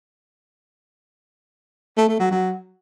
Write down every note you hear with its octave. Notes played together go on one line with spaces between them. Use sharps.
A3
A3
F#3
F#3